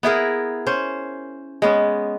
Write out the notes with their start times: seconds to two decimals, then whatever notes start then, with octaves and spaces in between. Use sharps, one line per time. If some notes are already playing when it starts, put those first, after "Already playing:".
0.03 B3 E4 G#4 A#4
0.67 C#4 C5
1.62 G#3 B3 C#4